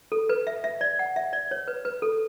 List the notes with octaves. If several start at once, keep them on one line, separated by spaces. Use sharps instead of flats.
A4
B4
E5
E5
D5
F#5
E5
D5
C#5
B4
B4
A4